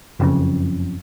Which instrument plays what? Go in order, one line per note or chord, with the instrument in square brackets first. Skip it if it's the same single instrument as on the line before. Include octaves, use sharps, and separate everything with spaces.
[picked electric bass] F#1 F2 C#3